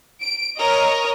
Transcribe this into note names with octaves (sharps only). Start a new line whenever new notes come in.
D7
A#4 C#5 D#5